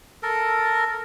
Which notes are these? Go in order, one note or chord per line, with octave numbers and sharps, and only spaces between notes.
A4 A#4